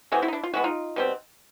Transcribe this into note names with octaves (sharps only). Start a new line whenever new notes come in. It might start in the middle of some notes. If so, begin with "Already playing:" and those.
E3 A3 C4 F#4 G#4
E4 F#4
D#4
D4 E4
F4
E3 G#3 B3 F#4
D#4 F4
B2 G3 C4